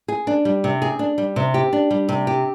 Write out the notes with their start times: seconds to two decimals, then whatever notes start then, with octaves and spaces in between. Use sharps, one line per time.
0.08 G#4
0.27 D4
0.45 G3
0.64 C3
0.82 G#4
0.99 D4
1.18 G3
1.36 C3
1.54 G4
1.73 D4
1.91 G3
2.09 C3
2.27 G4